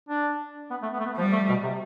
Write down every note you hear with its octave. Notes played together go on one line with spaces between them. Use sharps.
D4
B3
A3
B3
A3
B3
F3 G3
A3
B2
C3